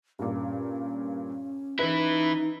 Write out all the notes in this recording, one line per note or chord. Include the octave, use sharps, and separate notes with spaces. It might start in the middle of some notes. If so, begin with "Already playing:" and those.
G2 A#2 C#4
E3 D#4 E4 B4